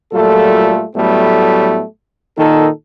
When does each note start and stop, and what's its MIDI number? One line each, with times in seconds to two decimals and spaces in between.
0.12 0.84 46
0.12 0.84 54
0.12 0.84 55
0.12 0.84 57
0.12 0.84 65
0.12 0.84 69
0.96 1.82 45
0.96 1.82 54
0.96 1.82 55
0.96 1.82 57
0.96 1.82 59
2.38 2.68 46
2.38 2.68 51
2.38 2.68 63
2.38 2.68 69